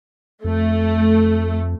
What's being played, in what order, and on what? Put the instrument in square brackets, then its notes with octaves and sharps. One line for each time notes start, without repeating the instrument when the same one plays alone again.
[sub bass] F2 [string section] A3